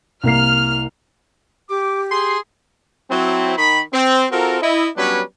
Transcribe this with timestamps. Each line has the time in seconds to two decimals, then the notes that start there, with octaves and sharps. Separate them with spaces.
0.23 C2 A#3 F6 C7
1.70 G4 D6
2.11 G#4 C6
3.11 F#3 C4 E4
3.58 D#3 B5
3.93 C4
4.32 C4 F4 F#4 A4 A#4
4.62 E4 D#5
4.97 F#3 G3 B3 C#4 D4 B4